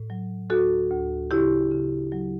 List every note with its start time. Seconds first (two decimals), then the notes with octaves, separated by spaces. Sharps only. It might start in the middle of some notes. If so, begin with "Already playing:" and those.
Already playing: A2
0.10 F#3
0.50 D2 F#4 A4
0.91 D2
1.31 C#3 E4 G4
1.72 C#3
2.12 F#3